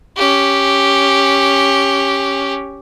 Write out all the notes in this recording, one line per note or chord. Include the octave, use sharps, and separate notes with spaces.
C#4 G4